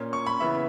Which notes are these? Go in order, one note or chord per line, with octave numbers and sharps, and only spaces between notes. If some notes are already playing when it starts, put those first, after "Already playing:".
Already playing: A#2 A#3 C#4
C#6
B5
C#3 E3 B3 E5